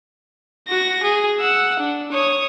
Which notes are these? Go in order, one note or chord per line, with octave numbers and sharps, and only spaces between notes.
F#4 A#6
G#4
F#5 E6
D4
C#5 D#6